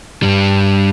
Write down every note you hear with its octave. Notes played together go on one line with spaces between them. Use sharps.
G2 G3